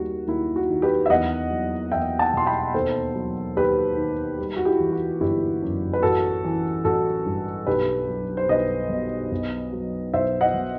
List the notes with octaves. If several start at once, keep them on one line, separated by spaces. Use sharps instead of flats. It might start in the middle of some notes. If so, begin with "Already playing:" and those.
Already playing: D#2 G3 F#4
D#2 E4
F#4
D#3
G4 B4
E5
E2 D#5 F#5
F#3
E2 E5 G5
F#5 A5
B2 C6
G5 B5
D#2 A4 C5
F#3
D#2 G4 B4
D#3
G3
F#4
E4 G4
E3
F#4
G1 E4 G4
F#2
B4
A1 F#4 A4
E3
A1 F#4 A4
G2
B1 G4 B4
F#3
C5
B1 B4 D#5
B2
B1
F#3
B1 C5 E5
D#5 F#5
B2